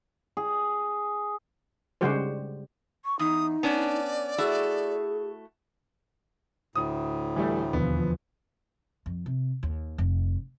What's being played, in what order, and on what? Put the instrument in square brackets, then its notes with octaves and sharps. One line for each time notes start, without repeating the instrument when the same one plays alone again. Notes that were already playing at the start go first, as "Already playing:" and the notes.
[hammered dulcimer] G#4
[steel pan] C#3 G3 G#3 F#4 G4 C5
[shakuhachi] C#6
[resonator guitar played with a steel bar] E2 [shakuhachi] D#4 [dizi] D#6
[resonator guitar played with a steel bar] B3 C#4 D4 [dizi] D5
[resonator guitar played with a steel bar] A3 E4 F#4 [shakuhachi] G#4
[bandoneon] D2 A2 [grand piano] D#6
[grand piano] E3 G3 A3
[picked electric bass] E1 D#2 D3 [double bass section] B2 E3 F3 [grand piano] B3
[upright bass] F2
C3
D#2
F1